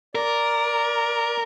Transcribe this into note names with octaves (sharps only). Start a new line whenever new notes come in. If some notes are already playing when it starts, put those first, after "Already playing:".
A#4 D5